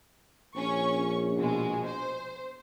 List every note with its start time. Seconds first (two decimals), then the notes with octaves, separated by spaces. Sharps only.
0.56 A#1 C#4 C#6
1.36 B2 G#3
1.87 C5